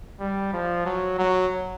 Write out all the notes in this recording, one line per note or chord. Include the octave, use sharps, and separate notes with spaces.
G3
F3
F#3
F#3